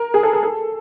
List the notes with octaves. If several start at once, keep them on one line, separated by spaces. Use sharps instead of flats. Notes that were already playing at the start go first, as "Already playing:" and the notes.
Already playing: A#4
G#4
A4
A#4
A4